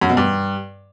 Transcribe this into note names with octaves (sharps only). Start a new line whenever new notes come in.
F#2
B2
G2